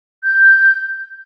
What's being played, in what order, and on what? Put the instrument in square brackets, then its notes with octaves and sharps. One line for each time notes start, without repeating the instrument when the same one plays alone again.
[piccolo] G6